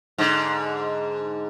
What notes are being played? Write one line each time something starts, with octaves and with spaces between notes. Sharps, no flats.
G#2 D3